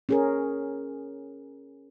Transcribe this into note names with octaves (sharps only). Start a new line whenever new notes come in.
C#4 G#4 A#4